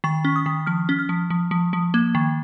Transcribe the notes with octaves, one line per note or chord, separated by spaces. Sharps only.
D#3 C#6
C#4
D#6
D#3
F3 F6
C#4
F6
F3
F3
F3
F3
A#3
D#3